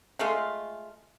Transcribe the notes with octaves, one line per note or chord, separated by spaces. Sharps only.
G#3 A3 F4